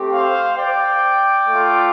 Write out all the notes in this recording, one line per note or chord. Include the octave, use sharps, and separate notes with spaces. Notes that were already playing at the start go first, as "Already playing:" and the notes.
Already playing: A3 C4 G4
C5 F5
D5 G5
A3 F4